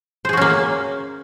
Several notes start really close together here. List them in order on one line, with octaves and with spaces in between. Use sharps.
C5 G#4 F#4 C#4 A#3